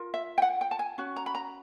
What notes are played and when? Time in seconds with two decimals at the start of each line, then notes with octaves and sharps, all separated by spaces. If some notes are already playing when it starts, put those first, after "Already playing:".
Already playing: F4 A#4
0.14 E5
0.38 G5
0.42 F#5
0.61 G5
0.71 A5
0.79 G#5
0.98 C#4 F#4
1.16 A#5
1.26 B5
1.35 A#5